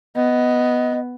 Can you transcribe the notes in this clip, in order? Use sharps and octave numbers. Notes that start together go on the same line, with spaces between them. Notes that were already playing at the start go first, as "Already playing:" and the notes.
B3 D#5